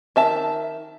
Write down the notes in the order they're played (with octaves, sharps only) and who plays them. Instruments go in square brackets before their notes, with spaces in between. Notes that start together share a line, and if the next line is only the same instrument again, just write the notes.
[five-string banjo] D#3 E5 A5